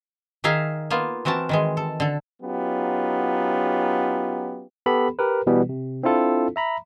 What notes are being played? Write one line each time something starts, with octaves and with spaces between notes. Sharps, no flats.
D#3 D#4 G#4 E5 F5 A#5
A#3 B3 F4
E3 C4 F#4 A#4 A5
D#3 E3 G#3
A4
D3 A4
F#3 B3 C#4 D#4 F4 G4
B3 G4 A4 B5
G4 A#4 B4
B2 E3 G3 B3
C3
C4 D4 E4 F4 A4
E5 A#5 B5